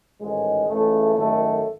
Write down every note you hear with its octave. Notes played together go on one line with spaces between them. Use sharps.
A1 G#2 D#3 G#3
C#2 C#3 E3 A3
G#1 F#2 D#3 A3